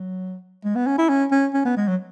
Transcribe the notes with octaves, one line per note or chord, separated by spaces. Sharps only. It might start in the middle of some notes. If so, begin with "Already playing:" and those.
Already playing: F#3
G#3
B3
C#4
E4
C#4
C#4
C#4
B3
G#3
F#3